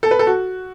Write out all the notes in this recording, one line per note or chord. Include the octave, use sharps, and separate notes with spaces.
A4
B4
A4
F#4